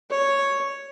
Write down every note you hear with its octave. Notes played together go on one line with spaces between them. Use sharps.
C#5